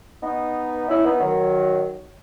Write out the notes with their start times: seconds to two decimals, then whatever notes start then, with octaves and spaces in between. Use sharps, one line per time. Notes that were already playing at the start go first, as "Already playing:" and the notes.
0.23 B3 D#4
0.88 C#4 E4
1.04 B3 D#4
1.20 D#3 F#3